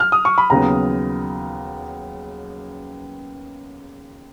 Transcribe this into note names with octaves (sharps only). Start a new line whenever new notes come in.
F6
D#6
C#6
B5
D#2 C#3 F#3 B3 A#5